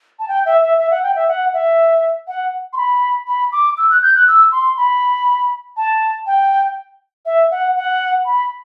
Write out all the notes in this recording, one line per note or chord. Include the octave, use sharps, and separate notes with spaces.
A5
G5
E5
E5
E5
F#5
G5
E5
F#5
E5
F#5
C6
B5
B5
D6
E6
F#6
G6
F#6
E6
C6
B5
A5
G5
E5
F#5
F#5
B5